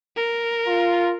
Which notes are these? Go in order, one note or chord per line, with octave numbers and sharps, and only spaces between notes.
A#4
F4